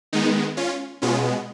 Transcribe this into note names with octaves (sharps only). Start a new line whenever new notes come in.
D#3 G#3 B3 D#4
C#4 F4
B2 G#3 B3 C#4 F4